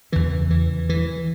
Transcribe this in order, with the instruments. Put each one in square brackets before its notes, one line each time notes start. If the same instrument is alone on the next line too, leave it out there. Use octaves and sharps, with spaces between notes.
[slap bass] E2 C#3 E3
E3
E3